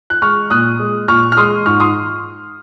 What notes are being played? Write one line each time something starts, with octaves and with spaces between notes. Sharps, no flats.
F#6
G#3 C#6 F6
A#2 D#6 F#6
G#3
A#2 C#6 F6
F6
G#3 C6 D#6
G#2 C#6 F6
C6 D#6